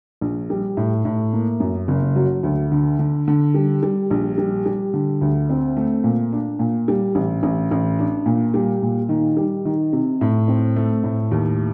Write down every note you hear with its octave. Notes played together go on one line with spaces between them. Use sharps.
A#1
G3
A2
A2
A#3
F#2
F#1
F#3
D2
D3
D3
D3
G3
G3
A#1
G3
G3
D3
D2
C4
A3
A#2
D4
A#2
G3
A1
A1
A1
D4
A#2
G3
A#2
D#3
G3
D#3
C3
A2
C4
A3
A2
D#2